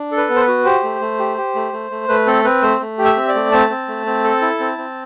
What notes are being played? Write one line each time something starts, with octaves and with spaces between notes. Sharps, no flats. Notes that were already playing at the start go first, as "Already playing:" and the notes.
Already playing: D4
A4
B4
B3
C5
B4
F#4
G4 C5
A3
A3
G4
G4
A3
A3
A3
A3 B4
C4 A4
C4 B4
A3 C5
A3
G4
E5
C4
D5
A3
C4 A5
C4
A3
C4
A4
E4
C4
C4